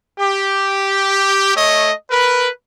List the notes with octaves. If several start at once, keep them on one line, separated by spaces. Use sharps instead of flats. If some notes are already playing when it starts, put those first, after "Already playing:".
G4
A3 C#5 D#5
A#4 B4